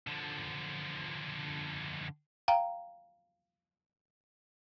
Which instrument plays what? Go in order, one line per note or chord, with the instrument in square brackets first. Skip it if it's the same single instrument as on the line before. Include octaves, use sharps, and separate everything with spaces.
[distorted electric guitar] D3 F3
[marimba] F5 G5 A#5